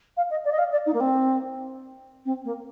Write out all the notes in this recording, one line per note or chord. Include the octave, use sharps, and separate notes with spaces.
F5
D#5
D5
D#5
F5
D5
D#4
A#3
C4
C4
A#3